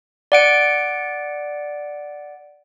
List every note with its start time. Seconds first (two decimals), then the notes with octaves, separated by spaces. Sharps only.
0.32 D5 F#5 D7